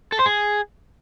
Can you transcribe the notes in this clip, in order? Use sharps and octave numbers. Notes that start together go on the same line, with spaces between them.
A4
C5
G#4